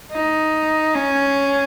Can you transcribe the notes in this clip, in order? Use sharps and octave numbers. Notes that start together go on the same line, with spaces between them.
D#4
C#4